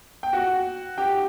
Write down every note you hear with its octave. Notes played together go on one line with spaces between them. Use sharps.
G5
F#4 F#5
G4 G5